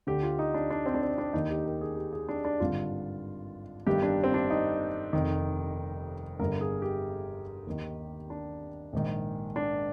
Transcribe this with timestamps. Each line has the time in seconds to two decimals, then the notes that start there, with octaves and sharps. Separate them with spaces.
0.07 D2 D3 G4
0.23 F4
0.39 D#4
0.54 D4
0.70 D4
0.86 C4
0.95 D4
1.02 C4
1.18 D4
1.33 D#2 D#3 D#4
1.49 G4
1.65 A#4
1.81 G#4
1.97 G4
2.13 G#4
2.29 D4
2.45 D4
2.60 G#1 G2 D3 F4
3.86 G1 G2 D#3 G4
4.03 D4
4.24 C4
4.34 D4
4.50 D#4
5.13 F1 F2 D#3
6.39 G1 G2 D3 A#4
6.61 G#4
6.82 G4
7.67 D#2 D#3
8.30 D4
8.93 A#1 G#2 D#3
9.56 D4